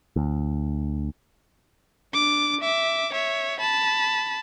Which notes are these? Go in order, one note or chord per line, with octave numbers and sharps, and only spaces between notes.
D2
D4 D6
E5 D6
C#5 E5
A5 B5